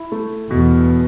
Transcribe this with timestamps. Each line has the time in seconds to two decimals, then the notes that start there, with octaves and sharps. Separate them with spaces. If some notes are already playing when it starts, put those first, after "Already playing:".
Already playing: E4
0.12 A3
0.50 E2 B2